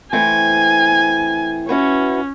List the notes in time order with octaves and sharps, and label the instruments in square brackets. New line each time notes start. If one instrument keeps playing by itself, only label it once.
[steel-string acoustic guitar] E3 A3 C4 [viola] G#5
[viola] C#4 [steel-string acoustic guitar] E4 F#4 B4